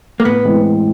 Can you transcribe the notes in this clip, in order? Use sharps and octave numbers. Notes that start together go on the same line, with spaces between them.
A#3
A2 B3
E3 G#3 C4